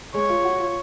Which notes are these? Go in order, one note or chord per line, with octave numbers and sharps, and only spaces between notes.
G#3 C#5
F4
F#4
F4